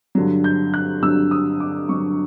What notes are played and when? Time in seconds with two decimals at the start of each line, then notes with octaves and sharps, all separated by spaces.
0.15 G2 D3 F#3
0.44 G6
0.74 F#6
1.02 G2 D3 F#3 E6
1.31 D#6
1.60 D6
1.89 G2 D3 F#3 C#6